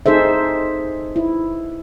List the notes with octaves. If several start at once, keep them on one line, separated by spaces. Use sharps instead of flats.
D#4 G#4 A4 C5 E5
E4